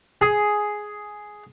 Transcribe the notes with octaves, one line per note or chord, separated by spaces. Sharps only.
G#4